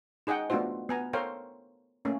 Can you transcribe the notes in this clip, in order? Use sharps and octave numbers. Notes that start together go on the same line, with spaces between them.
D#4 G#4 D#5 F#5 G5
A3 B3 D4 F4 F#4 C5
B3 G#5 A#5
A4 A#4 C5 C#5 F5 G5
A3 A#3 C#4